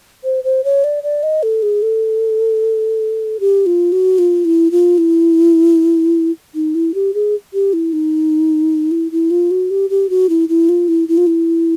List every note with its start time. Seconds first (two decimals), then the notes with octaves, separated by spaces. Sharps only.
0.24 C5
0.44 C5
0.64 C#5
0.84 D5
1.03 D5
1.23 D#5
1.43 A4
1.63 G#4
1.82 A4
3.40 G4
3.66 F4
3.92 F#4
4.19 F4
4.45 E4
4.71 F4
4.98 E4
6.55 D#4
6.75 E4
6.94 G4
7.14 G#4
7.53 G4
7.73 E4
7.93 D#4
8.91 E4
9.12 E4
9.31 F4
9.51 F#4
9.71 G4
9.90 G4
10.10 F#4
10.29 E4
10.49 E4
10.69 F4
10.88 E4
11.08 E4
11.17 F4
11.27 E4